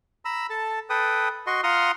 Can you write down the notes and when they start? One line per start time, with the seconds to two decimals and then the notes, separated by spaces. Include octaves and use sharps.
0.25 A#5 B5 E6
0.50 A4 A5
0.90 A4 B4 G5 D#6
1.47 F#4 D#5 C6 C#6
1.64 F4 F#5 A#5 C6 D#6 F6